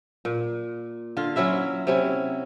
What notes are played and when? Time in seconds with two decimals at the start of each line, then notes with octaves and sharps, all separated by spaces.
0.25 A#2
1.17 D3 F4
1.36 F#3 C#4 E4 E5
1.87 C3 F#3 C#4 E4